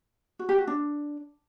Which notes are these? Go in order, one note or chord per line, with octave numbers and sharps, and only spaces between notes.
F#4
G4
F#4
D4